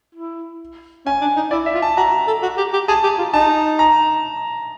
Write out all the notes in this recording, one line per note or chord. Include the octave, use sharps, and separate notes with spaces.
E4
C#4 G#5
D4
D#4
E4 D5
E5
F4
A5
F#4 A#5
A4
F#4
G4
G4
G#4 A5
G4
F4
D#4 A5
A#5